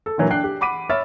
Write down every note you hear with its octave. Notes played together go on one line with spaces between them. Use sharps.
A4
A#2 D3 E3 F#3 A#3
D4 G5 F#6 C7
G4
F#5 B5 D6 B6 D#7
C#5 E5 B5 F6 A6